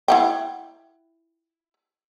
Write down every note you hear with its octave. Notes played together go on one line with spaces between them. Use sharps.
E4 F#5 G5